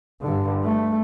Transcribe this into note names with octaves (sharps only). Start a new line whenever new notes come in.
G2 D3
A3